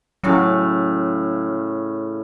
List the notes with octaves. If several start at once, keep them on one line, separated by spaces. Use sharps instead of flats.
A2 C#3 F#3 F5